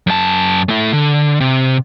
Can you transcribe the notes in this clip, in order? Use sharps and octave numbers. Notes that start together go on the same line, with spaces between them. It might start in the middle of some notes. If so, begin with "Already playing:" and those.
F#2 A5
A3 E4
D3
C3